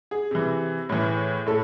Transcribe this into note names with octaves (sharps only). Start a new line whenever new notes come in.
G#4
C3 E3
A2 E3
A2 A4